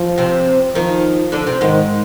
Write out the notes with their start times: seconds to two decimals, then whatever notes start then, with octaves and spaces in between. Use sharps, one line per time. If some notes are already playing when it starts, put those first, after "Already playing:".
Already playing: F3
0.18 C3 C4
0.75 D#3 F3 D#4
1.32 D3 D4
1.47 C3 C4
1.61 G#2 D#3 G#3